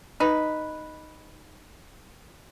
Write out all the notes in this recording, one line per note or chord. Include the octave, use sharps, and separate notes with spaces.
D#4 B4